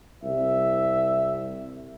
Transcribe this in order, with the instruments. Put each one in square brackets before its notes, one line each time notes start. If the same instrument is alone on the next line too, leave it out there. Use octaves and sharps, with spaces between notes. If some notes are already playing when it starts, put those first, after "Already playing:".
[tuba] C2 [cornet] E5